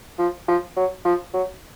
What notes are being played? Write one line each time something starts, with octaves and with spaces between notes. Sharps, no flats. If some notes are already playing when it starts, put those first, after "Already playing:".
F3
F3
F#3
F3
F#3